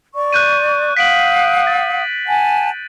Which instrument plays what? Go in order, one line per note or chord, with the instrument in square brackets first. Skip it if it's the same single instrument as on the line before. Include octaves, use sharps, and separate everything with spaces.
[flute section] D5 C#6
[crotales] F#6 G6 D#7
[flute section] F5 F#5 D#6 [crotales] B6 D7 F#7
[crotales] A6
[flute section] F#5 G#5 A5